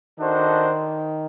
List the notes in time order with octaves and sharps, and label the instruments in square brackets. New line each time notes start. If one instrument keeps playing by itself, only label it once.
[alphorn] D#3 [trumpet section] D4 F#4 A4 C5 D#5